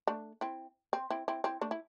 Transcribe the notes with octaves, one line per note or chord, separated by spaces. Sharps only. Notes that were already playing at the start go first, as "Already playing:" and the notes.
A3 D4
C4 E4
C4
C4 E4
C4 E4
C4 E4
A3 D4
E4